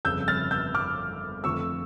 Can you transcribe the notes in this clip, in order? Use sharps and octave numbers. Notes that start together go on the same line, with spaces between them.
G1 F2 C#3 E6 G6
F6 A6
E6 G6
D6 F6
F2 D3 F3 A3 C#6 E6